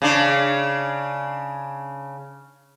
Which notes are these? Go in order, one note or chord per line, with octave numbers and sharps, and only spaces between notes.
C#3 D4